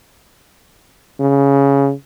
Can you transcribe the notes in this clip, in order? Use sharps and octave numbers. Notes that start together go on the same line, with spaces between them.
C#3